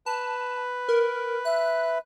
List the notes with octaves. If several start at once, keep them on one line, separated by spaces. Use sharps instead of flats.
B4 A5
A#4
E5 F#6